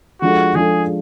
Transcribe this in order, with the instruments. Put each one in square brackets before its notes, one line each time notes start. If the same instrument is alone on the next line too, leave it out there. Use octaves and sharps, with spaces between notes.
[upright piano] F3 G#3 D4 F4 A4 [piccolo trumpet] F#4
[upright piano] F3 G#3 D4 F4 A4 [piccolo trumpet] G#4